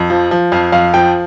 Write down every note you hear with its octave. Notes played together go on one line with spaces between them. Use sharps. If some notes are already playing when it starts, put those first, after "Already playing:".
Already playing: F2
F3
F3
F2 F5
F2 F5
F3 G5